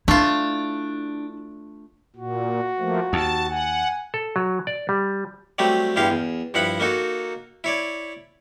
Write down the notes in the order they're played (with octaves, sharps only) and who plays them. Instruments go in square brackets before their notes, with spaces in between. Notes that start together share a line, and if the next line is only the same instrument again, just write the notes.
[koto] A3 F4 [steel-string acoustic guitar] D4 [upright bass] E4
[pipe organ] A#2 [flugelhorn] F#4
[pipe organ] F3 A3 A#3
[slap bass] D#2 [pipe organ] A5
[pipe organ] F#5 [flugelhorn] G#5
[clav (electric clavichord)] A4
F#3
D5
G3
[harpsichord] F#3 G3 A3 C4 G4
E2 G2 E4 G4 F5 C6
E2
G2 F3 E4 F#5 B5
A#3 D#4 F#4 A4
E4 C#5 D5